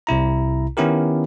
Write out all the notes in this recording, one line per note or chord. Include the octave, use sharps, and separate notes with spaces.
C2 C3 E4 A#5
D#3 B3 C#4 E4 G4 A#4